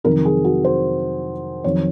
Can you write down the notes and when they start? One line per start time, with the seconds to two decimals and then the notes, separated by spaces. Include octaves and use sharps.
0.04 F2 C3 D#3 F#3 A#4
0.25 G#4
0.44 F#4
0.64 C5
1.64 F2 D#3 F#3 C#5